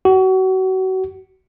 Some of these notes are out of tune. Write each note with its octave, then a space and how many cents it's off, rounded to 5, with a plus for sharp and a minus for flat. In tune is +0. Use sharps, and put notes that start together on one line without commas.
F#4 +30